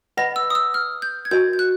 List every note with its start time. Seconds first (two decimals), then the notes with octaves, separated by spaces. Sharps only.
0.17 B4 D#5 F#5 B5 A#6
0.36 E6
0.50 D#6
0.55 E6
0.74 F6
1.02 G6
1.25 G#6
1.31 F#4 A#4 D#5 G6
1.53 G6
1.59 F#6